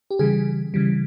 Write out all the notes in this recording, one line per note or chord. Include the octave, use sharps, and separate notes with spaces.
G4
C#3 E3 G3 G#4
C#3 E3 G3